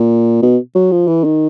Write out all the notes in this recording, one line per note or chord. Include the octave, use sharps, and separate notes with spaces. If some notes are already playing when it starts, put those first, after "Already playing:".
Already playing: A#2
B2
F#3
F3
E3
D#3